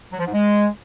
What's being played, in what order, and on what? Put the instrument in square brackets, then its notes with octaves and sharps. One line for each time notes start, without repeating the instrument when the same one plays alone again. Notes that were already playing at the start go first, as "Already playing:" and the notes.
[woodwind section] F#3
F3
G#2
G#3